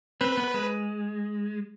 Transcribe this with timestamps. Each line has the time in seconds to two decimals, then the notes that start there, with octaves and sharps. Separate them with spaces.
0.21 C4 B4
0.37 B3
0.54 G#3